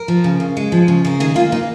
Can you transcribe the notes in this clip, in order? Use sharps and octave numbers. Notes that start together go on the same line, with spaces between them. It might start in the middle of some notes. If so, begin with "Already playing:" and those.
Already playing: A#4
F3
C#3
C#3
G#3
F3
C#3
C#3 A#4
D#3 G#4
A#3 F4
A#3 D#4